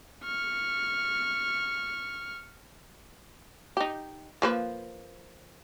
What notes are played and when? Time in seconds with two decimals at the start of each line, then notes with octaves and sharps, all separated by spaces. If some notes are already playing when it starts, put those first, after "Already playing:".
0.24 C#6 F6
3.77 D#4 G4
4.42 F3 A#3 B4